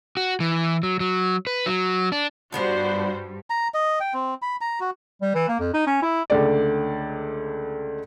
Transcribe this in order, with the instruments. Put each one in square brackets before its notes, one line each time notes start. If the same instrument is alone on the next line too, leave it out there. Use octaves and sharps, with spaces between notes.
[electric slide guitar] F#4
E3
F#3
F#3
B4
F#3
D4
[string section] G2 [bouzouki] F3 B3 D4 [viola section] F#4 C5
[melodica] A#5
D#5
G5
C4
B5
A#5
F#4
[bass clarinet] G3
E3
A#3
F2
D#4
C#4
E4
[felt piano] C#2 D3 A3 D5